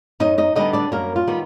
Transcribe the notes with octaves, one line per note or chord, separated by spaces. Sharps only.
F#2 D#4 D#5
D#4 D#5
D3 G3 B3 D#4 D#5
D4 D5
F#2 A#3 A#4
F4
D#3 G3 B3 D#4